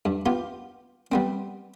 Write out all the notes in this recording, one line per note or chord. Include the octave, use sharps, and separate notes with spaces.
G2
B3 F4 G4
G3 B3 C4